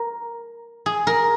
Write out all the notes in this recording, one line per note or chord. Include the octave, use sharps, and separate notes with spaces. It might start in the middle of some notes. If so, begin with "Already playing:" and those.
Already playing: A#4
G#4
A#4